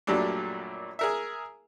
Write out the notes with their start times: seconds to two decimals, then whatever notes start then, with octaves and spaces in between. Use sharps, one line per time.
0.07 F#2 A#2 F#3 G3 A3 D4
0.99 G#4 A#4 E5